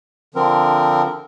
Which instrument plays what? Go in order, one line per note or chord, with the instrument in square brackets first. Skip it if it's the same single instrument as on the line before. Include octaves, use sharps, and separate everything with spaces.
[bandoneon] D3 F3 C4 A#4